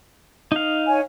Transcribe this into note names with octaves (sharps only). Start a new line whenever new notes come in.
D#4 F5
C#5 G#5